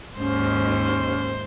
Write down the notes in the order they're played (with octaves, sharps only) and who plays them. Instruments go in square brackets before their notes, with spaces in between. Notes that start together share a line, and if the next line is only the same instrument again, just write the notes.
[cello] D#2 G#2 [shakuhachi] C#4 [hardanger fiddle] C5